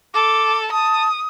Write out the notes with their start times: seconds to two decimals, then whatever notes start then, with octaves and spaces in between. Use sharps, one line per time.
0.14 A4 D6
0.72 A5 D#6